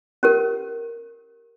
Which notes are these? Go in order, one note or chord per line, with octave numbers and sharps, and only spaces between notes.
C#4 G4 A#4